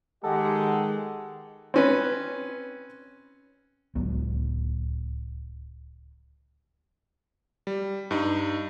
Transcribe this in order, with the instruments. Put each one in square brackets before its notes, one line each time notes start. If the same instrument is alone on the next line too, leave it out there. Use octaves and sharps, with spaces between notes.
[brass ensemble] D#3 G#3 [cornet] G4 [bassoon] A4 [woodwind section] D#5 F#5
[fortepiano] C4 C#4 B4
[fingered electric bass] D1 C#2 F#3 B3
[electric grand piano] G3
G2 D#4